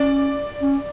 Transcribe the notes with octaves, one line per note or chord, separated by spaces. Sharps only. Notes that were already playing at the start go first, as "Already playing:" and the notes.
Already playing: C#4 D5
C#4